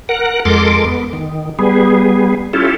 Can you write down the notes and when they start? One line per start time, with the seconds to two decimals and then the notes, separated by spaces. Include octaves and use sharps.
0.09 A#4 F#5
0.45 F2 G#3 A4 A#4 C6 D6
0.86 B3
1.13 D#3
1.59 G3 B3 G#4
2.53 C#4 E4 F4 G4 A4